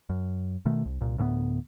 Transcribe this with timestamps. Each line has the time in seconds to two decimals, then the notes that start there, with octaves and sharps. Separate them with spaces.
0.10 F#2
0.65 B2 D#3 A3
0.85 C2
1.01 C2 A#2
1.18 D2 A2 G#3 B3